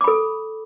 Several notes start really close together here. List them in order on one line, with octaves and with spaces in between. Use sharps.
D6 B5 A4